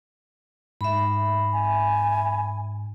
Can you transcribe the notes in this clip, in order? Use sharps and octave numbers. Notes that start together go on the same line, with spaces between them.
G#2 E5 B5
G#5